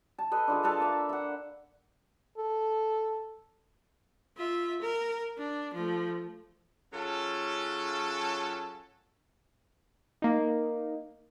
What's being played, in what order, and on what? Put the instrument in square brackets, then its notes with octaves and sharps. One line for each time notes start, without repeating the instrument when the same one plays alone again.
[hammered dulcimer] A5
A4 B4 D#5
D4 F4 G#4
A4 B4 F5 A5
A#3 E5
E5 F#5
[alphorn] A4
[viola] F4 E5
A#4
D4
F3 A3
[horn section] F#3 C#4 F4 G#4 A4
[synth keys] A#3 D#4